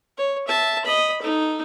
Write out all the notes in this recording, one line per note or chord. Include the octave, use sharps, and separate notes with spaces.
C#5
E5 A5
D#5 B5
D#4 A4